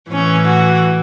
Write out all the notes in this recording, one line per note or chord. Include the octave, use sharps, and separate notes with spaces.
A2 E3 C#4
F#4